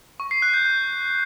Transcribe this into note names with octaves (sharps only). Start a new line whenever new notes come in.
C#6
C7
F#6
G6
G6